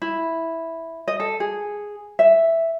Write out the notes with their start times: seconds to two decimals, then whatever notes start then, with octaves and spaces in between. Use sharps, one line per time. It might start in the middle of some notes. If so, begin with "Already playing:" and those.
0.02 E4
1.08 D#5
1.20 A4
1.40 G#4
2.19 E5